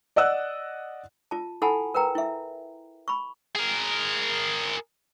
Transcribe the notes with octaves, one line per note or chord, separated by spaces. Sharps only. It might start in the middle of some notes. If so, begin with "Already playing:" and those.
D5 D#5 F#5 E6 F#6
F4 A5
E4 A4 F#5 G#5 A5 B5
A#4 B4 G5 A#5
E4 E5
B5 C#6
G#4 A#4